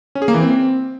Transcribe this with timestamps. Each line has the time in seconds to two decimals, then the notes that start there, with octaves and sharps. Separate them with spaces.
0.15 C#4
0.22 G#4
0.28 A#3
0.34 E3
0.41 C4